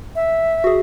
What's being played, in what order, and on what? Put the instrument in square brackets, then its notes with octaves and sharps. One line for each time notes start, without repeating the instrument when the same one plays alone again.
[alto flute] E5
[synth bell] F#4 G#4